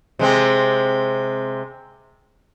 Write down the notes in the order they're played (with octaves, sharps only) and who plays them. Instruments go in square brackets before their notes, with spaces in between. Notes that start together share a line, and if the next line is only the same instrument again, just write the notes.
[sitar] C3 G#3 C4